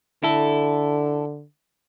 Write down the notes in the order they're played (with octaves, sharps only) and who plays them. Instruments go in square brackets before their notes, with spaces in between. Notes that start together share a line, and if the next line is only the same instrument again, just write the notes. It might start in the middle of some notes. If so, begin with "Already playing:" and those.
[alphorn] D3 [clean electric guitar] E4 A4